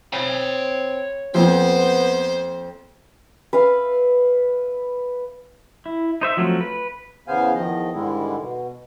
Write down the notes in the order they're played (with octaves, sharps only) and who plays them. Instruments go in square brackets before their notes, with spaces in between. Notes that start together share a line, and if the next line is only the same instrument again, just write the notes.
[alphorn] C4 [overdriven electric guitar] C#5 B5
[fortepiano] F2 A#2 [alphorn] B3 [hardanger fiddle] C5
[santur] B4 E5 F5
[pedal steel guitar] E4
D#4 C5 E5
F3 F#3 A3 C4 F4
B4
[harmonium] E2 C#3 B3 C5 F5 G#5
E2 D#3 F3 D#5
G#2 D3 D#3 G3 G#3 E4
B2